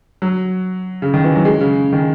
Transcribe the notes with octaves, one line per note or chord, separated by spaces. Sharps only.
F#3
C#3
D#3
E3
F#3
G#3
C#3
D#3